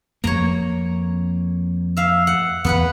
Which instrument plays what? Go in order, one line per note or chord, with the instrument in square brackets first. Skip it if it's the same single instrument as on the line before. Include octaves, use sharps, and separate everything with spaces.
[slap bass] F2 A#3 [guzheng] C#5 A#5
[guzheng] E5 F5
F#5
[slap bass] E2 [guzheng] B3 B4 F#5